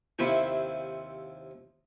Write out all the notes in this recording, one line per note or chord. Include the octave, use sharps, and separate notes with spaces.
D#2 C3 F3 E4 C5